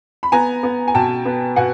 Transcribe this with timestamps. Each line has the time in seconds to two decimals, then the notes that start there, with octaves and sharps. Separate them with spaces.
0.23 B5
0.32 B3 G#5 A#5
0.63 B3
0.88 G#5
0.94 B2 G5 A5
1.25 B3
1.56 B2 F#5 G#5